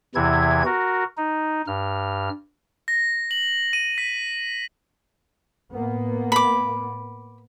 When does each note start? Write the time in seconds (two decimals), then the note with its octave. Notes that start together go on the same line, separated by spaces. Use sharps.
0.15 E2 C3 E3 E4 G#6
0.65 F#4 A#4
1.17 D#4
1.67 G2 F6
2.88 A#6
3.31 F#7
3.73 D#7
3.98 B6
5.73 A2 A#3 B3
6.32 B5 D6